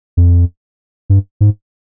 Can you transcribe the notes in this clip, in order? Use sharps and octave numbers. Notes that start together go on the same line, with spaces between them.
F2
G2
G#2